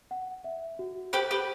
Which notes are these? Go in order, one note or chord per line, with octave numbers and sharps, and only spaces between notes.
F#5
E5
F#4
G4 B4 C5
G4 B4